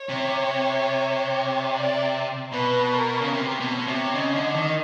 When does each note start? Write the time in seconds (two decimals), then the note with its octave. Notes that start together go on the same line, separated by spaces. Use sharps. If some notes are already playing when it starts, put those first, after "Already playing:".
Already playing: C#5
0.09 C3
1.71 D5
2.52 B2 B4
2.93 A#4
3.22 C#3
3.33 C3
3.60 B2
3.74 C#5
3.87 C3
4.14 C#3 D#5
4.35 D3
4.55 D#3